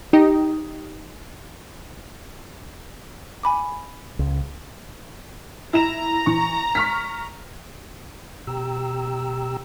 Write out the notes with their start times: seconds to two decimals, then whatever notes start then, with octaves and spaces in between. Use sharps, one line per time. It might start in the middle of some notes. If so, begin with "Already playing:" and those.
0.13 D#4 G4 D#5
3.43 G#5 B5 D6
4.19 C#2
5.73 E4 A#5 E7
6.26 E3 C#6
6.75 C#6 F6 B6
8.47 B2 G4 G5 A#5 E6